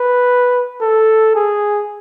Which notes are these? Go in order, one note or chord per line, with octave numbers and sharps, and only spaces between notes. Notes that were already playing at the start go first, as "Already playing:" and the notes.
Already playing: B4
A4
G#4